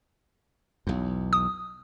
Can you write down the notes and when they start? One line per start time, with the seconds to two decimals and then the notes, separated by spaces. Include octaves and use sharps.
0.87 B1 E2
1.33 D#6